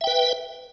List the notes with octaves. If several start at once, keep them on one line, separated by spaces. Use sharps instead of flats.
B4 E5 G5